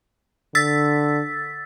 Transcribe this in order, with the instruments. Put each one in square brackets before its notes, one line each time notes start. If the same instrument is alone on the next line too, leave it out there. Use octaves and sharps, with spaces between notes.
[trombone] D3 [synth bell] E6 A6 B6